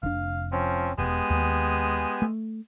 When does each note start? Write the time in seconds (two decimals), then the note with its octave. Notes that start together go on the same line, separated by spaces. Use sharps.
0.03 F1 D4 F5
0.52 F3 C4 C#4
0.98 E1 G#3 B3 G4 G#5
1.30 D#2
2.22 A3